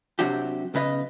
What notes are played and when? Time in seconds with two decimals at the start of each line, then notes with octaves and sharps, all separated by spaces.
0.19 C3 F#3 D4 F#4 G4
0.74 B1 C#3 B4 D#5